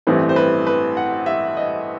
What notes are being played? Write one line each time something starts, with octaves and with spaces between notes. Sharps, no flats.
A1 G2 E3 A3 C4 B4
C5
B4
B4
F#5
E5
D#5